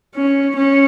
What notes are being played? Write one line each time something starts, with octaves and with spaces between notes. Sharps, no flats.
C#4
C#4